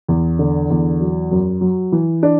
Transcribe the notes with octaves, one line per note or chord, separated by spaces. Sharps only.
E2
D3
E2
F#3
F#2
F#3
E3
D4